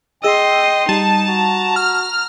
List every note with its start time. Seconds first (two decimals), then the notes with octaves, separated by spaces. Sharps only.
0.23 G#4 D#5 G5 C6 E6
0.89 G3 D#4 A5
1.28 F#4 A#5
1.76 F6